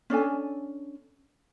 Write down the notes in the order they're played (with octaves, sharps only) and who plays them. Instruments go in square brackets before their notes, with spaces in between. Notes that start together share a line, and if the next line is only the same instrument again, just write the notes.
[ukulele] C#4 D4 A4 G#5